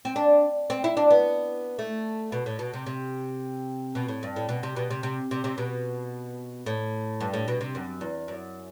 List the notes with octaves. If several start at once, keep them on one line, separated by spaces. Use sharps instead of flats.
C4
D4
C4
E4
D4
B3
A3
B2
A2
B2
C3
C3
B2
A2
G2
A2
B2
C3
B2
C3
C3
C3
C3
B2
A2
G2
A2
B2
C3
F#2
E2
F#2